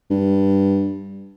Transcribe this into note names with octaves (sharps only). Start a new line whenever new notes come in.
G2